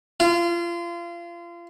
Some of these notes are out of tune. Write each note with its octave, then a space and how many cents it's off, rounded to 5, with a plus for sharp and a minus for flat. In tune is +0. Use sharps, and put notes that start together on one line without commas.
F4 -30